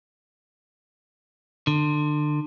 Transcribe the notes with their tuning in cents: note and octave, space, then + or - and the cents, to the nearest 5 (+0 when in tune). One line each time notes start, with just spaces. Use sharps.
D3 +30